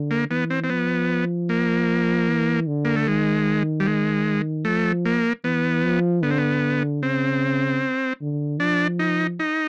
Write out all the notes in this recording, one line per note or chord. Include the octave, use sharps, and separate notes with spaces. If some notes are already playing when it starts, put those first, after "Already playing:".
Already playing: D3
A#3
E3 B3
C4
C4
F3 B3
A#3
E3
D3
A#3
A3
D#3 G#3
G3
G#3
F3 A3
A#3
E3 B3
F3
D3 B3
C4
B3
C#3 C4
D3
F3 D4
D#4
D#4